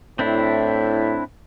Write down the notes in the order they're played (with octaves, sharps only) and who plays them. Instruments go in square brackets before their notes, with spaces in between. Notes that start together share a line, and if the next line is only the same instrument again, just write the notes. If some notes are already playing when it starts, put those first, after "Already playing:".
[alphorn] A2 [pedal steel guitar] C4 D4 E4